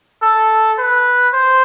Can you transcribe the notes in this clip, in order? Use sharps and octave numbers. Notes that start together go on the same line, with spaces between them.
A4
B4
C5